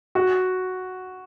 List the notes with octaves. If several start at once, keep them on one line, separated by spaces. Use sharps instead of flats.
F#4